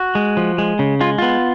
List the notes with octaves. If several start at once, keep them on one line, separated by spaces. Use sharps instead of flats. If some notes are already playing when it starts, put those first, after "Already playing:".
Already playing: F#4
G#3
F3
G#3
C#3
G#3 F4
B3 F4